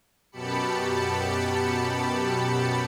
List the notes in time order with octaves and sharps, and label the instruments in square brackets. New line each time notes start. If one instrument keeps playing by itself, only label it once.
[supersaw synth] F#2 B2 G4 A5 B5 C#7